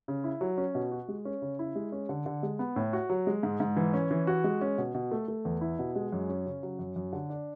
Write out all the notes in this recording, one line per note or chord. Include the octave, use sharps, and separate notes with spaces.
C#3
E4
F#3
C#4
B2
F#4
G#3
C#4
C#3
E4
G#3
C#4
D3
D3
G#3
B3
A2
F#4
F#3
G#3
G#2
G#2
E3
C#4
E3
F#4
G#3
C#4
B2
B2
A3
A3
E2
E4
B2
G#3
F#2
C#4
C#3
F#3
F#2
F#2
D3
D4